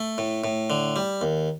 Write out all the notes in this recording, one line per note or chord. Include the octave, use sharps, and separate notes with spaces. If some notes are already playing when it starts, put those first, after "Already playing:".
Already playing: A3
A2
A2
D3
G3
D#2